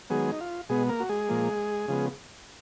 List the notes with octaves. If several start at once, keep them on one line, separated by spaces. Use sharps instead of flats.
D#3 F#3 G#3 B3 G#4
D#4
F4
B2 G#3 B3 G#4
A#3 A#4
F#4
G#3 G#4
A#2 F3 A#3
C#3 F3 G#3 B3